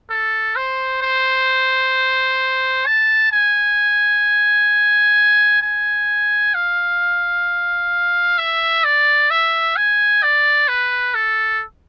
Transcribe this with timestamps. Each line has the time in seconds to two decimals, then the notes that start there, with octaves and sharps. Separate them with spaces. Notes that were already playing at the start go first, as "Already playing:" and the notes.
0.10 A4
0.56 C5
1.02 C5
2.86 A5
3.32 G#5
5.62 G#5
6.55 F5
8.38 E5
8.84 D5
9.31 E5
9.77 G#5
10.23 D5
10.68 B4
11.15 A4